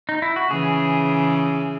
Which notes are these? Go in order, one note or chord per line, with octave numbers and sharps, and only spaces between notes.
D#4
E4
F#4
C#3 E3 G#4